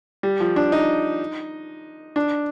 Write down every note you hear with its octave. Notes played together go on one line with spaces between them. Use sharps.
G3
F3
D4
D#4
D4